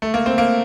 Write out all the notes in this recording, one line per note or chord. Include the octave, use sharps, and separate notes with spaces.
A3
A#3
C4
A#3